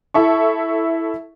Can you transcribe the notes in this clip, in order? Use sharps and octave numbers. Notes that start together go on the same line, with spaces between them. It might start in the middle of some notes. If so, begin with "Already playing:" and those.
E4 A4 E5 A5 C#6